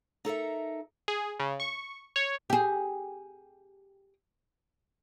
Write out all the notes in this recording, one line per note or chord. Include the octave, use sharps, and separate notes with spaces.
D#4 A4 A#4 E5
G#4
C#3
C#6
C#5
G4 G#4